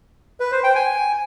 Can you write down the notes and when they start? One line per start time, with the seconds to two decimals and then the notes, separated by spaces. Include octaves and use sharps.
0.40 B4
0.52 C5
0.64 G5
0.76 G#5